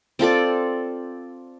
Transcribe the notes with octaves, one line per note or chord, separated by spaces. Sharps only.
C4 F4 A4 D5